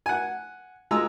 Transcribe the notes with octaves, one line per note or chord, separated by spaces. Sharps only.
F#5 G#5
G#3 F4 A#5 E6